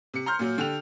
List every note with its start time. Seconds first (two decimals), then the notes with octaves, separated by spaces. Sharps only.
0.14 C3 C#7
0.26 A#5 C6 F6 G6
0.39 A#2 F#3
0.58 D3 G4 F7